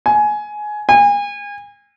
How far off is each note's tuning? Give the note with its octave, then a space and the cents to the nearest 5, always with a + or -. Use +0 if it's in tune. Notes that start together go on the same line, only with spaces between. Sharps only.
G#5 +15
G#5 -35